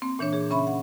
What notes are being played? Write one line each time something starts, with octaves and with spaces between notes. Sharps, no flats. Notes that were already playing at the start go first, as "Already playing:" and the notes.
A#3 C4
A#2 E3 D4 C#5
G#4 C#5
C#3 C#4 E5 B5
F#5